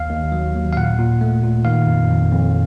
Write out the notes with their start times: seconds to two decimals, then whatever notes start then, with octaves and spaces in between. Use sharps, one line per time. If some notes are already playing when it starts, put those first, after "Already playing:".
Already playing: D#2 F5
0.10 D#2
0.32 F#3
0.55 D#2
0.73 F5
0.76 A#2 F#5
0.99 A#2
1.21 A3
1.44 A#2
1.65 D#3 F5
1.87 F2
2.09 F2
2.32 F2